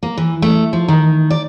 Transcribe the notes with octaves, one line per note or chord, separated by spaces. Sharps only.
A#3
E3
A3
F3
D#3
D5